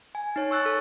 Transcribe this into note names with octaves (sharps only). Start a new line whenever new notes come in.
G#5
D#4 C#5
C#6 E6 F#6 A6
A4